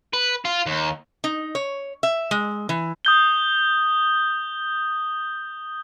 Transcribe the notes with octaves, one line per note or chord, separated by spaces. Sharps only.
B4
F4
D#2
D#4
C#5
E5
G#3
E3
D#6 G6 G7